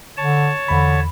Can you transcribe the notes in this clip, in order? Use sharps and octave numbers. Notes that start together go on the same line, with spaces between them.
D3 C#5 A5
E2 D3 B5